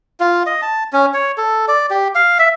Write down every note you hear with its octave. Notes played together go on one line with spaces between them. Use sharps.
F4
D#5
A5
C#4
C#5
A4
D5
G4
F5
E5